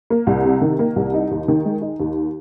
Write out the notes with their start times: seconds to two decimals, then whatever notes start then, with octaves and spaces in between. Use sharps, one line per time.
0.10 A#3
0.27 C2
0.45 C3
0.62 D#3
0.79 A#3
0.96 C2
1.14 D#4
1.31 D#2
1.48 D#3
1.65 G#3
1.81 D#4
2.00 D#2